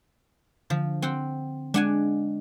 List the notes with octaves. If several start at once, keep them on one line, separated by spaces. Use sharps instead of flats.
D3 F3
C4 F#5 G5
G#3 D4 F#5 G#5